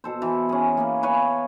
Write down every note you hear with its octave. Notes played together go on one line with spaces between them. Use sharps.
B2 A4 C5
E3
C#4 G#4
A#3 B3 G#4
B4 C#5 F5 G#5